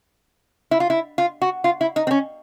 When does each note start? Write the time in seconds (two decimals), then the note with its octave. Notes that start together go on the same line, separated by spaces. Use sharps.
0.71 E4
0.80 F4
0.90 E4
1.18 F4
1.42 F#4
1.64 F4
1.81 E4
1.96 D#4
2.07 C4
2.11 C#4